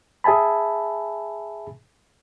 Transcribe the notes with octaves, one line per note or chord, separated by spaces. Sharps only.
G#4 E5 G#5 A5 B5